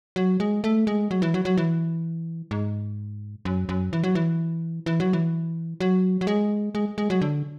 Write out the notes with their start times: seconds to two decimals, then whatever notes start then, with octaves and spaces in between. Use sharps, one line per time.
0.16 F#3
0.40 G#3
0.64 A3
0.87 G#3
1.11 F#3
1.22 E3
1.34 F#3
1.45 F#3
1.58 E3
2.51 G#2
3.45 F#2
3.69 F#2
3.93 E3
4.04 F#3
4.15 E3
4.86 E3
5.00 F#3
5.13 E3
5.81 F#3
6.21 F#3
6.27 G#3
6.75 G#3
6.98 G#3
7.10 F#3
7.21 D3